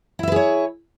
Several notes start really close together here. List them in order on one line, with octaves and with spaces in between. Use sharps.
E4 E5 B4 G#4 C#5